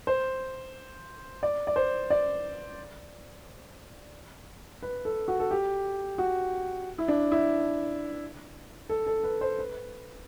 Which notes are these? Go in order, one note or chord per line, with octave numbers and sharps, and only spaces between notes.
C5
D5
D5
C5
D5
B4
A4
F#4
A4
G4
F#4
E4
D4
E4
A4
A4
B4
C5
B4